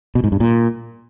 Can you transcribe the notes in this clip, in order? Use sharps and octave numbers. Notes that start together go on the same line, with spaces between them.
B2
G#2
G2
A#2